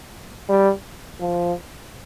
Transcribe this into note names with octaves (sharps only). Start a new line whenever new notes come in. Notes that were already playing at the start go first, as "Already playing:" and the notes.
G3
F3